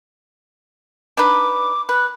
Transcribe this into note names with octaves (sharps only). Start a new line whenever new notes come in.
D4 D#4 B4 D6
B4 F#6